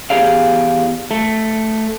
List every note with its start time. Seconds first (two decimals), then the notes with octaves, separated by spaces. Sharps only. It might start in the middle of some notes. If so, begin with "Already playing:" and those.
0.10 E2 G2 G4 G#4 D5 F5
1.11 A3